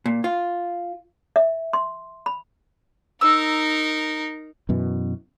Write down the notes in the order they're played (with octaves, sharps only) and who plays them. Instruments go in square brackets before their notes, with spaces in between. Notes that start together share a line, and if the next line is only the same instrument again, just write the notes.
[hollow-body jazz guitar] A#2
F4
[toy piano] E5
C6
B5
[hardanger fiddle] D#4 A#4 [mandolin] E6
[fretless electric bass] F#2 B2 E3